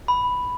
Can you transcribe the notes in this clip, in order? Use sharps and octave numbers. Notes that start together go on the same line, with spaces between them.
B5